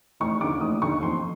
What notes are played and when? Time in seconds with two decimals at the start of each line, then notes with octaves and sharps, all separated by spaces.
0.20 F1 C#6
0.41 D#2 D3 D6
0.61 F1 D#6
0.82 D#2 D3 C#6
1.02 F2 C6